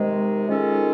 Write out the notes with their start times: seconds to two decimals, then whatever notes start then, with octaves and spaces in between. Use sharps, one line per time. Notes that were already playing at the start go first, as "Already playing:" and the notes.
Already playing: C3 D#3 G#3
0.49 D#3 G#3 C#4 F4 A4